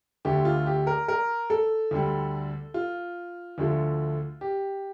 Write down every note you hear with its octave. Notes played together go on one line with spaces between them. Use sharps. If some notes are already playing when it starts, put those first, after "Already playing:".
D2 D3 A3 G4
F4
G4
A#4
A#4
A4
D2 D3 G3
F4
D2 D3 F3 A3
G4